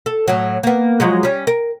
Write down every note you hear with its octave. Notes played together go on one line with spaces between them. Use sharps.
A4
A2 F#3
A#3 B3
F3 F#3 G#3
G3 C#4
A#4